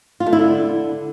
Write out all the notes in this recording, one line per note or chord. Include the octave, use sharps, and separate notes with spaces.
F4
A3
E4
D3